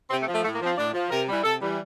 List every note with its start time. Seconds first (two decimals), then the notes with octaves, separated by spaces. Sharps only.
0.10 C3 C4
0.21 A3
0.27 F3
0.33 A3
0.43 A2 A3
0.55 A#3
0.61 F3
0.66 C4
0.78 A2 D4
0.94 F3
1.11 C3 A#4
1.28 E3 G3
1.44 C3 A4
1.61 E3 G3